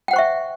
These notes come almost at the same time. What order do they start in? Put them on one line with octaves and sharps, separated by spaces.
G5 F#5 C5 C#6 E5